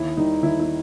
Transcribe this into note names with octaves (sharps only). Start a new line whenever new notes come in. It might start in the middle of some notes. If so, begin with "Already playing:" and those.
Already playing: D#2 E4
D#3 G3 D#4
D#2 E4
E4